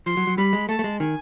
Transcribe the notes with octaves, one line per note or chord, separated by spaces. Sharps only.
F3 C6
F#3
F#3
G3 B5
G#3
A3 A5
A3
G#3
D#3 G#5